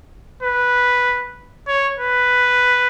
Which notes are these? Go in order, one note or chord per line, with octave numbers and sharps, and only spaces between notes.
B4
C#5
B4